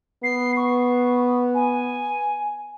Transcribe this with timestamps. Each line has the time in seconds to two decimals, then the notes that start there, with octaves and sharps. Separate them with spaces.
0.24 B3 C7
0.57 C#6
1.55 G#5